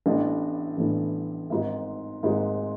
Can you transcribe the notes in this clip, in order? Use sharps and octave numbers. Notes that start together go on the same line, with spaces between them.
A1 A2 E3 B3 D4
A1 A2 E3 B3 D4
G#1 G#2 G#3
G#1 G#2 G#3